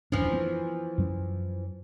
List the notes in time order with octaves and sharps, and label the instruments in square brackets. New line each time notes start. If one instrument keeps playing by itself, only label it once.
[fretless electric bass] D#1 F#2 D4 [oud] E3 F3
[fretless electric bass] B3
F#2 F#3